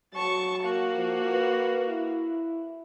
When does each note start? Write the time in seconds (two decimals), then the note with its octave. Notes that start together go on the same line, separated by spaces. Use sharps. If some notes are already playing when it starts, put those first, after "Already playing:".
0.14 F#3 A5 C#6
0.64 A#3 F#4
0.94 F3
1.31 B4
1.89 E4